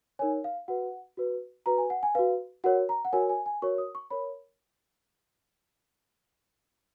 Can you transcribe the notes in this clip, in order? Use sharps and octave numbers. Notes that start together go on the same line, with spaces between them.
D#4 A#4 C#5 G#5
F5
F#4 B4 F#5
F#4 B4
F#4 B4 A#5
G#5
F#5
G#5
F#4 B4 F5
F#4 A#4 C#5 F#5
A#5
F#5
F#4 A#4 C#5 G#5
G#5
G#5
F#4 A#4 C#5 C#6
D#6
C#6
A#4 C#5 B5